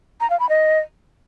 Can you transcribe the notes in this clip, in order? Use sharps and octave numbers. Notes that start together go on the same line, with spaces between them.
A#5
F5
B5
D#5